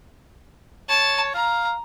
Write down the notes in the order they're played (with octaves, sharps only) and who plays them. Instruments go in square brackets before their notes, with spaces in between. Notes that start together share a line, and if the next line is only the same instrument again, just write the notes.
[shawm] C#5 [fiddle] A5
[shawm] F5 [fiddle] A#5